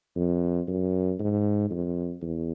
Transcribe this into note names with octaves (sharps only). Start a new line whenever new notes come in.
F2
F#2
G#2
F2
E2